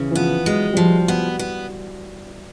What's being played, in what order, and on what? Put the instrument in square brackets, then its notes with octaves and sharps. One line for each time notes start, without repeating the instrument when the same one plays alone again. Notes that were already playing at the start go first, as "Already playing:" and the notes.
Already playing: [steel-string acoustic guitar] C#3 [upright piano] E3
[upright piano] E3
[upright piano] F3 [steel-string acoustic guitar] B3
[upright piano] F#3 [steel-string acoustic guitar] G#3
[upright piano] G3
[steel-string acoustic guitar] F3 [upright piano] F#3
[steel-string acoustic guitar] B3
B3